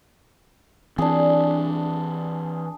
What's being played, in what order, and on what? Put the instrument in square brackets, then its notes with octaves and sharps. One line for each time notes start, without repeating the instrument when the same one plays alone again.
[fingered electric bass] E3 C4 [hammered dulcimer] D4 G#4